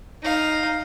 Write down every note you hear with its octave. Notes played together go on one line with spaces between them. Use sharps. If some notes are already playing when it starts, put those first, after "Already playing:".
D#4 F5